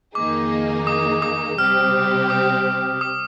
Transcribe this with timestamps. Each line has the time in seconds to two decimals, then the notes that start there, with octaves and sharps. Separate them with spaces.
0.15 F2 D#3 A#3 D#4 G#4 D6
0.87 D#6
1.22 D#6
1.58 C3 G3 C4 G4 F6
2.30 D#6
3.01 D#6